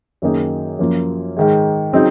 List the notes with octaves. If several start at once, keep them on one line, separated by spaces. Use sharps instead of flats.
F#2 D#3 A#3 D#4 G#4
F#2 F3 A#3
G#2 D#3 G#3
C#3 F#3 C4 D#4